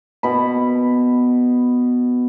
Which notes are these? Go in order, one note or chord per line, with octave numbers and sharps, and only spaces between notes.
B2 B5